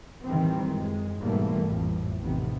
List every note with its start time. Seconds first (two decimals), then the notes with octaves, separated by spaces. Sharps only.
0.24 A2 D#3 E3 G3 C4
0.68 F#2 G#3
1.21 G#2 B2 E3 G3 A3 A#3
1.65 A1 F2 A2
2.20 A1 F2 A2 C3 D#3 B3